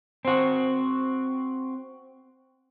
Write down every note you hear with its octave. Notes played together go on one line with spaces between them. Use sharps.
C4 F#4